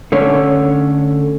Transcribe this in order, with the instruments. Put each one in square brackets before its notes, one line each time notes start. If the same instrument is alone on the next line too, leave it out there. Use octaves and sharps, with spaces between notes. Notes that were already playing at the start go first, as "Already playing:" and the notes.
[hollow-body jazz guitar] D3 A3 C#4